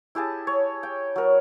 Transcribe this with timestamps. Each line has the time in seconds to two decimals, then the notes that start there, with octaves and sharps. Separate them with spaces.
0.15 E4 G4 G#4 A5
0.47 C#5
0.83 G5
1.16 F#3 A#4